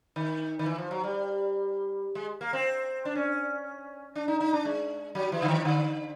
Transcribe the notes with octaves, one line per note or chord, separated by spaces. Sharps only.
D#3
D#3
E3
F3
F#3
G3
G#3
A#3
C4
D4
C#4
D4
D#4
D#4
D4
G#3
F#3
E3
D3
D#3
D3